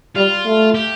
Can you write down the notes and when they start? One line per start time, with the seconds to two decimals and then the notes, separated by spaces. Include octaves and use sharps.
0.15 G3 F4
0.45 A3
0.75 G4